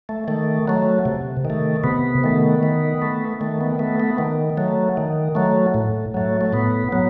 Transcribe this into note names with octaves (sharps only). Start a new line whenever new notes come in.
A3
D#3 A3
F#3 A3
C3
D#3
A3
C3 B3
D#3 A3
D#3
A3
D#3 A3
B3
A3 B3
B3
D#3
F#3 A3
D#3
F#3 A3
A2
F#3 A3
A3
A2 B3
F#3 B3